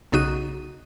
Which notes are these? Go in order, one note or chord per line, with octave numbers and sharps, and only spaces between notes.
B1 C#3 D#4 F#4 D#7